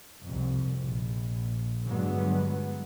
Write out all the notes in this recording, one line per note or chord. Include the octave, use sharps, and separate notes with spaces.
C2 F2
A#1
G2 D3 F#3 G#3 B3